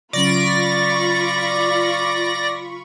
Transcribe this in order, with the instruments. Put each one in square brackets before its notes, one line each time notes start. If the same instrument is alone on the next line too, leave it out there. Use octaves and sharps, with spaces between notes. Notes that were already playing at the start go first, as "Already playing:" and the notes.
[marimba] C#3 F#3 C#4 [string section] F4 B5 C#6 [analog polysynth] D5 A#6